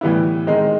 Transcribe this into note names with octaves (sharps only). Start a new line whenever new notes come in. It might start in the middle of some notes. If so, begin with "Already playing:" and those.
A2 E3 G3 B3 E4
D#3 G#3 C4 D#4